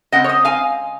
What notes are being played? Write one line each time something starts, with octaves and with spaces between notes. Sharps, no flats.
C#3 G#3 C4 D#5 F#5
C#5
C5 D#5
F5 G#5